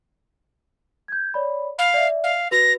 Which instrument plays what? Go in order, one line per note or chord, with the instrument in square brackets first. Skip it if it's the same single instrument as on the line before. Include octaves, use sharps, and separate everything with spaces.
[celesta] G6 G#6
C#5 D5 B5
[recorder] F5 [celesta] B5
[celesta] D5 E5
[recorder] F5
[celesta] F#4 B4 [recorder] A#6